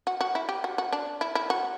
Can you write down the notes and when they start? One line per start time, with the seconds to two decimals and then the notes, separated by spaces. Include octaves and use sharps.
0.07 F#4
0.21 F#4
0.35 E4
0.49 G4
0.64 F#4
0.78 F#4
0.93 D4
1.21 E4
1.35 E4
1.50 F#4